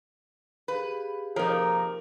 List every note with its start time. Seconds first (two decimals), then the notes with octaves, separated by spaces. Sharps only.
0.68 G4 G#4 B4 F5
1.36 F2 C3 F3 A#3 D#4 A#4